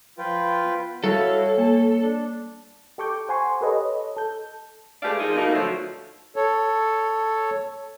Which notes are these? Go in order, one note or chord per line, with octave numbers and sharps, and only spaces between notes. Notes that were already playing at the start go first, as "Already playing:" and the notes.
F3 F4 B4 G5
B3
G3 E4 F#4 A4 C#5 F5
A#3 A5
D4
G4 A4 C#6 D6 G6
C5 F#5 G#5 C6 C#6
G4 A4 B4 C#5 D#5
A4 G6
G#3 A3 G4 B4 D5 F5
A#2 F3 D#4 F4 G#4
B2 A3 A#3 D#4
D3 F3 F#3 A3 A4 C5
A4 C#5